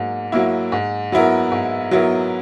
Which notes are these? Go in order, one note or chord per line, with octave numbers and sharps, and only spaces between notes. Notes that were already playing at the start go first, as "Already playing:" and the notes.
Already playing: G#2 F#3 A#3
F#3 A#3 E4
G#2
F#3 B3 E4 A#4
G#2
F#3 B3 E4 A#4